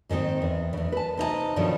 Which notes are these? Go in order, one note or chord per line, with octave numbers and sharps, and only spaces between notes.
G#2 D#3 F3 C4 D#5
E2
E2 C#3
B4 A5
C3 D#4 D#5 A5
G2 B2 D3 D#3 F3 C#4